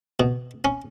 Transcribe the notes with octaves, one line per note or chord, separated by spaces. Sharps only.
B2
C#4